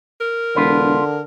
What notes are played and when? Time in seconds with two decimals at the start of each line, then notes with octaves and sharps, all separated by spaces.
0.21 A#4
0.56 E1 D3 F4 B4